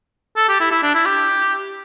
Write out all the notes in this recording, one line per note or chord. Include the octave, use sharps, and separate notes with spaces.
A4
G4
E4
E4
D4
E4
G4